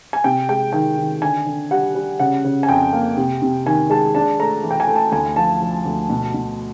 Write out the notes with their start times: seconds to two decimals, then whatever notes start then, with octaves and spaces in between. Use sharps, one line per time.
0.13 G#5
0.24 C3 G5
0.49 G#3 G5
0.73 D#3 G5
0.97 D#3
1.22 D3 G#5
1.46 D3
1.71 G3 F#5
1.95 G3
2.20 C#3 F#5
2.44 C#3
2.63 G#5
2.69 F2 G5
2.93 A#3
3.17 C3
3.42 C3
3.66 D#3 G#5
3.90 G#3 A5
4.15 D4 A5
4.39 A3 A#5
4.63 E3
4.71 G5
4.80 G#5
4.87 A3
4.96 A5
5.12 D2 G#5
5.36 F3 A5
5.61 F3
5.86 D2
6.09 B2
6.34 B2